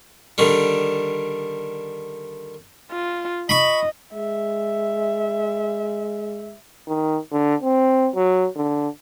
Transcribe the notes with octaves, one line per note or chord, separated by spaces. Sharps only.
D3 D#3 G3
F4
D#5 B5 C#6
G#3 E5
D#3
D3
C4
F#3
D3